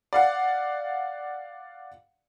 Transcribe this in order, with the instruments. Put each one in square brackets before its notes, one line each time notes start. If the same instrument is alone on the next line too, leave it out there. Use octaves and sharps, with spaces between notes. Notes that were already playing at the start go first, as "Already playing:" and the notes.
[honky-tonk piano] D5 F5 F#5